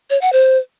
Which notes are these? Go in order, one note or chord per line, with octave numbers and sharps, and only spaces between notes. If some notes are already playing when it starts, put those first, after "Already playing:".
C#5
F#5
C5